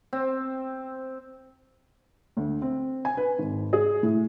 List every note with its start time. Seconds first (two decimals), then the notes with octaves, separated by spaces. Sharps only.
0.13 C4
2.37 D2
2.62 C4
3.05 G#5
3.17 B4
3.38 G#1
3.73 G#4
4.03 A2